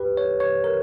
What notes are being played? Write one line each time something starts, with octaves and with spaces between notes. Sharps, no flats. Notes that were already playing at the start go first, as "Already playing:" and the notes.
Already playing: G4 B4
C#5
C#5
A#4